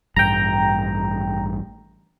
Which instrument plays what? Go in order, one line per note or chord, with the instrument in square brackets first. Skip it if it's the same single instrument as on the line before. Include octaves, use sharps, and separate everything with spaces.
[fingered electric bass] A1 G2 [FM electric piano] G5 A#5